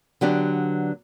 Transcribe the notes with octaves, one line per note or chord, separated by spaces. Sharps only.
D3 F#3 B3 D4 G4